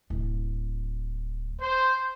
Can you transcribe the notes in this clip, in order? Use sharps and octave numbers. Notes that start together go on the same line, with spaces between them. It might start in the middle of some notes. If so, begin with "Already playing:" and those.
D1
C5